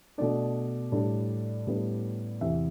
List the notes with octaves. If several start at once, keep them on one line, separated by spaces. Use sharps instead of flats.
B2 A3 D4 D5
A2 G3 D4
A2 G3 B3 D4
E2 C3 E3 E5